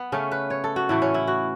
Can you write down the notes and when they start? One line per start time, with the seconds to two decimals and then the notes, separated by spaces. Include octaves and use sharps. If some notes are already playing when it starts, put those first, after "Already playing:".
Already playing: B3
0.12 C#3 A3 C#4
0.31 B4
0.50 C#5
0.64 A4
0.76 F#4
0.89 A2 E3 A3 E4
1.02 C#4
1.14 E4
1.27 F#4